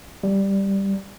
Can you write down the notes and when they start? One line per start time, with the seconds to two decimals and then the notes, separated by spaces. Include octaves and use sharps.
0.23 G3